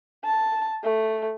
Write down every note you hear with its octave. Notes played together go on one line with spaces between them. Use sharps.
A5
A3